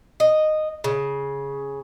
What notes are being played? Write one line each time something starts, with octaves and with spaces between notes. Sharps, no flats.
D#5
C#3